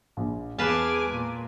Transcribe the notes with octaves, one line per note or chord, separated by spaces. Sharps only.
A#1
E2 G#4 B4 F5 G#5 A5 D6
A#2